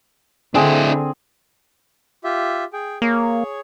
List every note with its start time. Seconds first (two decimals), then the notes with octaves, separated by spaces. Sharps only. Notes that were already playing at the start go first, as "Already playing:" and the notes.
0.55 D3 C4 D4 E4 G#4
2.24 F4 G4 E5
2.73 G#4 G5
3.02 A#3 G#4 C#5